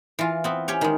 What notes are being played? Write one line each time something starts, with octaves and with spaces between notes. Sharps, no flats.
E3 F4
B3 C4
C#4 G4 C#5
D#3 G#3